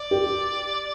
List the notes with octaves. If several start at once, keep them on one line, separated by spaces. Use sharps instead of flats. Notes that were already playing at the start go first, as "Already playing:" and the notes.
Already playing: D5
G4